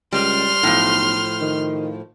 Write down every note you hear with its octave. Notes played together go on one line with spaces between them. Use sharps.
C#2 G3 C6 F6
B1 A2 F3
D#3